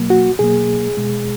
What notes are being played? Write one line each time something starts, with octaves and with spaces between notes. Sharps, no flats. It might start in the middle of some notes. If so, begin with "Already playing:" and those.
Already playing: B2 F#3 A#3
F#4
B2 F#3 A#3 G#4
B2 G#3